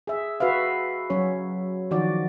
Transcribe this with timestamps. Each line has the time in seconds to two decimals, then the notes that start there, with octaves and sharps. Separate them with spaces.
0.07 G#4 E5
0.40 F#4 B4 E5 F5
1.10 F#3 C#4 C#5
1.91 D#3 F3 F#4 D5